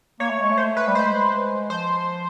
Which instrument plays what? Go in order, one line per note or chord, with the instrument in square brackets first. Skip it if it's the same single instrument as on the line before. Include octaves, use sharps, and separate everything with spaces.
[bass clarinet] A#3 [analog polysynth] C#5
[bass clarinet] A3
G#3
A3
[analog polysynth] C5
B4
[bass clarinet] G3
[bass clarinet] G#3 [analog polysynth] C5
[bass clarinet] F3 [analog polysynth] C5